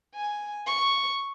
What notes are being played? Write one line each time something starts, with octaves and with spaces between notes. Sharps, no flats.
G#5
C#6